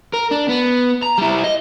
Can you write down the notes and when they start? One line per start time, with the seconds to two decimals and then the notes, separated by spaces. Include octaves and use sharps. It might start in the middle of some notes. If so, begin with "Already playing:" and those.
0.13 A#4
0.31 D4
0.48 B3
1.02 A#5
1.18 G3 E4
1.44 D#5